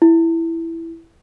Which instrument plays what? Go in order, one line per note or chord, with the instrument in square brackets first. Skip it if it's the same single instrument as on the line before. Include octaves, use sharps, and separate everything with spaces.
[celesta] E4